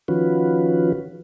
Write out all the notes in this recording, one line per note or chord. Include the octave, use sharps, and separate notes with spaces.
D#3 F3 C#4 F4 F#4 B4